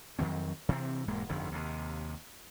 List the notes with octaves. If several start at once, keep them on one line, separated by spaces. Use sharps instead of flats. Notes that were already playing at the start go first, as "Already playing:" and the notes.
F2 D#3 F#3 C4
C3 E3 B3 C4
E1 G#2 G#3 A#3
G1 F2 D3 D#3
D#2 C3